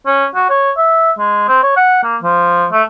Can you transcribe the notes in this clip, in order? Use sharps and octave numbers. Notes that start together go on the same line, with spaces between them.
C#4
F#4
C#5
E5
G#3
C4
C#5
F#5
A#3
F3
A3